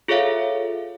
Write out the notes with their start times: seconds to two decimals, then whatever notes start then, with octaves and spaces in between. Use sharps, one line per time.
0.08 F4 G#4 A4 C#5 E5 F5